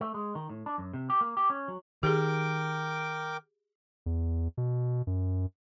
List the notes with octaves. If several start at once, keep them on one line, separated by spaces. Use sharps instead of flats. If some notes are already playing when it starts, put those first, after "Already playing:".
A3
G#3
D#3
A2
D4
F#2
C3
G4
A#3
G4
C#4
F#3
D#3 G4 G#4 A#4 G5 D6
E2
B2
F#2